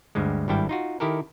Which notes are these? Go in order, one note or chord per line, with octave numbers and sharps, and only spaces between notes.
D2 G2 G3 G#3
G#1 G2 G3 E4 G5 A5
D#4 F4 F#4
D#3 E4 G4 A4 A#4